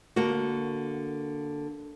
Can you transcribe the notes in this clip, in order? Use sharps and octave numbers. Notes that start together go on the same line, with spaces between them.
D3 A#3 F#4